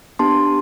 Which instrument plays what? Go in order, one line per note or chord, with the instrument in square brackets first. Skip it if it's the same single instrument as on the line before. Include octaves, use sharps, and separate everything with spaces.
[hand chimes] B3 D4 G4 A5 C6